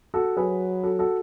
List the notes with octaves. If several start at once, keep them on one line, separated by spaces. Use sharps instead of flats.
F#4 A4
F#3 G#4 B4
F#4 A4
F#4 A4